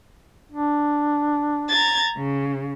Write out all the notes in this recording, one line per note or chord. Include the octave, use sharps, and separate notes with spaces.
D4
A#5 G#6 A6
C#3